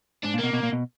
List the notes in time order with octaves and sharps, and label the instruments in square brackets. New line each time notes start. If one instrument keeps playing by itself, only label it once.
[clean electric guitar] G#2 [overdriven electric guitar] D4
[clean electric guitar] A#2
[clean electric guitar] B2 [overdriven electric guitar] A#3
[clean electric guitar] B2
A#2
B2